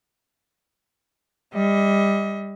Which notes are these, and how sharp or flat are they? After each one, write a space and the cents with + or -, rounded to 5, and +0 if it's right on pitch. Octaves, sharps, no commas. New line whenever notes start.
G3 +25 D#5 +35